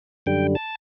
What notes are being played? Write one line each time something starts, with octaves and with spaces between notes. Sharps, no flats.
F#2 D3 G3 G5
A5